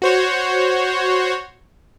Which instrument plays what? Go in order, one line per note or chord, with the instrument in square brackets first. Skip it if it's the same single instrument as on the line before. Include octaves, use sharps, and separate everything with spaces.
[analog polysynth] F#4 C5 C#5